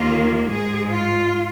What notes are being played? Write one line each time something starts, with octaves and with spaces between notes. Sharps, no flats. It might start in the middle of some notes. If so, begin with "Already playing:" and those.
Already playing: D#2 D#3 A#3 F4
G#2 G#3 G#4
F4